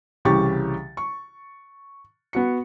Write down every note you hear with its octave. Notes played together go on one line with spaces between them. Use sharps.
C2 C#3 E3 G4 C#6 A6
C#6
B3 F#4 C#7